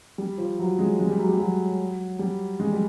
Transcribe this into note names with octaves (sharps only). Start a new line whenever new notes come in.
G3
F3
F#3
G#3
G#3
G3
F#3
G3
F#3
G3
G#3
G3